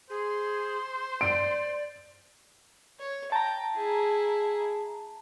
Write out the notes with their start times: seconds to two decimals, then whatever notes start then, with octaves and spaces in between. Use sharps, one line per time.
0.10 G#4 C5
1.21 D5 D7
2.99 C#5
3.32 G5 A5 A#5
3.75 E4 G#4